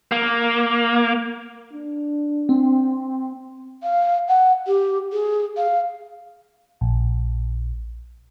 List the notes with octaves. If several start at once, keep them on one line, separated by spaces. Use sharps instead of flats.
A#3
D4
C4
F5
F#5
G4
G#4
F5
A#1